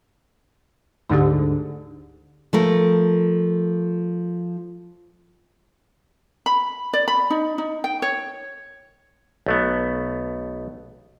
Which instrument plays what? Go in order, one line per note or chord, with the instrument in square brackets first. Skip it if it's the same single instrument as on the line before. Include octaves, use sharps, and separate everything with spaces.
[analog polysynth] D2 G#2 D3 [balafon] D#4 G4
[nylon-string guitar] F3 A3 A#4
[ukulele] B5
D5
B5
D#4
D#4
G5
C#5
[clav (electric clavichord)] B1 A3 B3